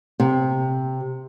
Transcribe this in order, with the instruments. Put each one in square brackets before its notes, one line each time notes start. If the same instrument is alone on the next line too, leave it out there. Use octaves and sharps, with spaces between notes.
[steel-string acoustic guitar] C3